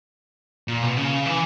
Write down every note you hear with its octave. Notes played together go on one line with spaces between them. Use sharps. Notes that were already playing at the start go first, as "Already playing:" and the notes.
A#2
B2
C#3
E3